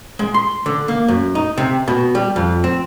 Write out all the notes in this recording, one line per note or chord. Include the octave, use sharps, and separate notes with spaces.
G#3
C6
D3
A#3
F#2
D#4
C3
B2
G3
F2
C4